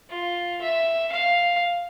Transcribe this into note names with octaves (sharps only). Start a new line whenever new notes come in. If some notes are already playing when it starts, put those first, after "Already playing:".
F4
E5
F5